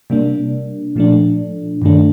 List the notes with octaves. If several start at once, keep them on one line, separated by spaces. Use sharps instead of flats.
C3 G3 A#3 D4
A#2 F3 A3 D4
G2 D#3 A3 D4